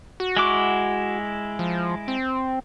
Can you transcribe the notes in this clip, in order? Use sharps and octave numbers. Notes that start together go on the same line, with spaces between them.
F#4
G#3 E4 D6
F3
C4